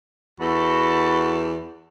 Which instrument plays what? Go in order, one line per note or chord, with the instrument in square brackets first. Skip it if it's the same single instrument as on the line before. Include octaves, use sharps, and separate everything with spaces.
[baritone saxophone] E2 [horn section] F#4 A4 [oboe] B5